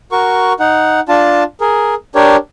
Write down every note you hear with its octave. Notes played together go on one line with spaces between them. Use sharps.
F#4 A#4 C#6
D#4 F#5
D4 F4 A5
G#4 A#4
D4 G4 A#4 C#5